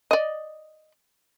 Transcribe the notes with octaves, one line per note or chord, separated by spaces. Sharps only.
D5 D#5